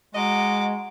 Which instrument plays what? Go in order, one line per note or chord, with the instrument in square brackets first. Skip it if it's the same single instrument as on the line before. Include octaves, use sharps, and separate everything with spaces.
[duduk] G#3 [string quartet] F#4 [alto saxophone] D#5 [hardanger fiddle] A#5 D6